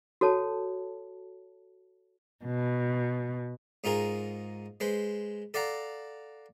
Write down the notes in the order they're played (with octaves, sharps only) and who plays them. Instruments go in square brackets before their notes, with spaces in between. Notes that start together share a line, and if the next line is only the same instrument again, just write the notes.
[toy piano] F#4 A4 C#5 A5
[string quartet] B2
[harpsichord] G#2 D#4 F4 G#4 A#4
G#3 B4 C5
A4 D5 F5 F#5 A#5